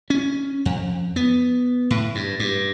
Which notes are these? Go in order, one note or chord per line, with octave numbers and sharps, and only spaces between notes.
C#4
F2
B3
A2
G2
G2